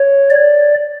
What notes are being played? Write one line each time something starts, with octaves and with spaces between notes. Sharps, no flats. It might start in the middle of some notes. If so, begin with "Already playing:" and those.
Already playing: C#5
D5